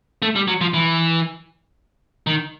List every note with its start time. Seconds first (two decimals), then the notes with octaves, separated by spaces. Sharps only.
0.22 A3
0.35 G3
0.48 F#3
0.61 F3
0.74 E3
2.27 D#3